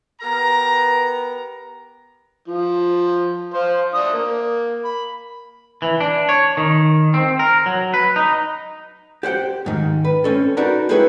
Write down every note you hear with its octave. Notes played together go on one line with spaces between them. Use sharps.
B3 G4 A#4 A#5
F3
C5 F5
D4 D#6
A#3
B5
E3
D4
C#5
D#3
C4
A#4
F#3
B4
D#4
G4 C5 F#5 G5
G#2 D#3
B4
C4 C#4 A4
D#4 F#4 A#4 B4 D5 A5
C4 E4 G#4 A4 B4 C#5